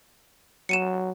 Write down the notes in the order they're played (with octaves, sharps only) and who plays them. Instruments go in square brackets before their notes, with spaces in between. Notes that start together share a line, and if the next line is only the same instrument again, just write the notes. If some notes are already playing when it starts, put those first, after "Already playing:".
[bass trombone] F#3 [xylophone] C#7 D#7 E7